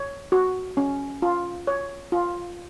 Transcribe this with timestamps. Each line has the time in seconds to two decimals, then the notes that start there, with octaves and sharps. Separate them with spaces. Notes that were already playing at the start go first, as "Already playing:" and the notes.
Already playing: C#5
0.32 F#4
0.77 C#4
1.22 F4
1.67 C#5
2.12 F4